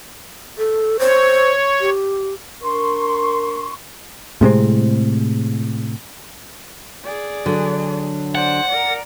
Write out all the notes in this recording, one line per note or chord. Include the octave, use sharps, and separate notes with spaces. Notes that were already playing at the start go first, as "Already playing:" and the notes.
A4
C5 C#5
G4
D4 A#4 C6 C#6
A2 C3 G#3 C4
G#4 D5
D3 F#3
C5 D5 F#5
A#4 D5